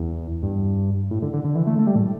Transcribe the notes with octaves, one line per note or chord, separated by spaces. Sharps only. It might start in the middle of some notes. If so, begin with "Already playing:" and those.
Already playing: E2
G2
A2
D3
D3
D3
E3
A3
A3
G3
A2